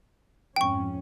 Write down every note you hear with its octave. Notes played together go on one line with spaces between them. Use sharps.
F2 G#2 C#4 G5 C#6